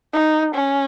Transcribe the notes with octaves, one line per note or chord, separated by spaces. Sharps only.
D#4
C#4